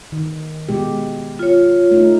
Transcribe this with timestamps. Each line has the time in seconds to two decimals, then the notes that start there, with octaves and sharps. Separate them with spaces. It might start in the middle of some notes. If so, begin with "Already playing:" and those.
0.12 D#3
0.69 B2 G#3 G4
1.39 F4 C#5
1.91 A3 D#4